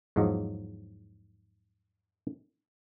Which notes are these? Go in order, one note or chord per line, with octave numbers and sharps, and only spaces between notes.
E2 G#2 F3 F#3 D#5